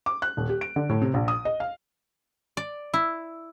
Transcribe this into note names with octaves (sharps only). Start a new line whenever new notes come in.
D6
F#6
D#1
G4
D7
D3
A2
C3
A#1
D#6
D#5
F5
D5
E4